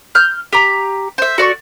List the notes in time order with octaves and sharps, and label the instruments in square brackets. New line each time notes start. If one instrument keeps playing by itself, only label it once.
[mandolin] F6 G6
G4 A#5
C5 E5
F#4 D5 C#6